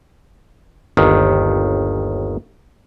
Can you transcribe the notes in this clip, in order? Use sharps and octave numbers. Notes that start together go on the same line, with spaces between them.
G1 D#2 D#3